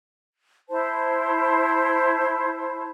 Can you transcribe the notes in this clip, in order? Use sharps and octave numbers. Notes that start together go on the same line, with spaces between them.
E4 C5 A5